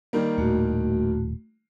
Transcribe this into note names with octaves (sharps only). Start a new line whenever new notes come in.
D#3 G3 A#3
D#1 A2 A3 F#4